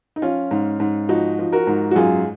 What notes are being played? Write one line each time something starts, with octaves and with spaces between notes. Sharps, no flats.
D#4
F3 C#4 F4
G#2
G#2
F3 D#4 F#4
F3
F#4 A#4
G#2
F#4
F#2 F4 G#4